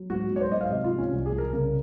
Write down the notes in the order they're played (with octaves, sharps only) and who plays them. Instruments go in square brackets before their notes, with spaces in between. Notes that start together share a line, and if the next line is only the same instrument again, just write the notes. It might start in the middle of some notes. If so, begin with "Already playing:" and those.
Already playing: [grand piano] F#3
G#2 F#4
F#3
C#5
C5
G#2 D#5
F5
C3 D#5
F4
F3
C#4
C2
G#4
C2
A#4
C#3 A#4